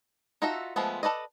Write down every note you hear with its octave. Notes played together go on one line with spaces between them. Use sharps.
D#4 F4 F#4 A4 E5
F3 G#3 A3 B3
A4 B4 D5 D#5